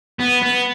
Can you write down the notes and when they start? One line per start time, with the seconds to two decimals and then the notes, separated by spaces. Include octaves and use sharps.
0.20 B3
0.43 B3